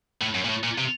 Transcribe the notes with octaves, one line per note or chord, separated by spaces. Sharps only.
A2
F#2
A#2
A2
A#2
C3